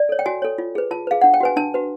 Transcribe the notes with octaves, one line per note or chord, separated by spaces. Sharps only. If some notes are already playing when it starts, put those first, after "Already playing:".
Already playing: D5
A4 C#5
G5
F#4 G#5
A4 C#5
F4
G#4 B4
F4 A5
G#4 B4 F5
D4 F#5
G5
F#4 B4 G#5
D4 A5
F#4 B4